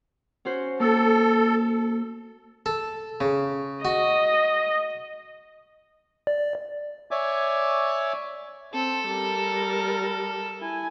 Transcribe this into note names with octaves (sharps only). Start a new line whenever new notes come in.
C#4 F#4 C5
A#3 A4
A4
C#3
F#4 D#5
D5
C#5 D5 E5 G#5 D6
C4 A4
G3 A#4
E4 G#5